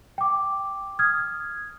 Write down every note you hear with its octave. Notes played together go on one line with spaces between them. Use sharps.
G5 D6
D#6 F6 G#6